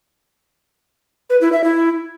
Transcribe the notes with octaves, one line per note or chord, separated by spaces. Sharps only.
B4
E4
E5
E4